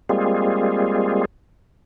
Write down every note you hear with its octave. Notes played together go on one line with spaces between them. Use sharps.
G3 G#3 A#3 C4 F4 G#4